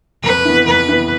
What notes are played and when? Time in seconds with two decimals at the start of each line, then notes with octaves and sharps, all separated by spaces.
0.24 F2 B4
0.45 E3 B3
0.67 F2 B4
0.89 E3 B3